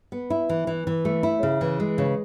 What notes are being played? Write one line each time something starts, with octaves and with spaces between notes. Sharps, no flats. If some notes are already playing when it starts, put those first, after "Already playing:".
B3
E4
E3
E3
E3
A3
E4
C#3
E3
G#3
C#3